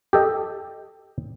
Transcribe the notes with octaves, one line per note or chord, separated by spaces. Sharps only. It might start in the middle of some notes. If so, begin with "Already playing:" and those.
G4 A4 D#5